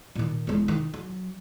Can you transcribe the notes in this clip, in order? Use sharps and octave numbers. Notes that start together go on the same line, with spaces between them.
A#2 D#3
E1 G#3
D#3
F#3